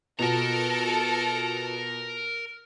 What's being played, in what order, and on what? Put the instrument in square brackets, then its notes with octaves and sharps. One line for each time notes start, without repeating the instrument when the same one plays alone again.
[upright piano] B2 [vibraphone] F4 [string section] A4 [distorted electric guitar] A#4 A#5